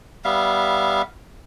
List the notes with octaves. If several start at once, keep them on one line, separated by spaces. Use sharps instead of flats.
G3 B3 E5 F5